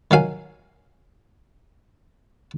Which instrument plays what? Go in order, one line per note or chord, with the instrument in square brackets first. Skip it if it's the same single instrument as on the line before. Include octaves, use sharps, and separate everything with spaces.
[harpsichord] D#3 F#3 F5 G#5